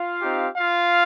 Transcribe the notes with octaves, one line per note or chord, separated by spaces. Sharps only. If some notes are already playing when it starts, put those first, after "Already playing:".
Already playing: F4 F5
C4 D#4 G4
F4 F5